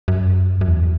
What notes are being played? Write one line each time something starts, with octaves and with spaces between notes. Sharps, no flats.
F#2
F#2
E2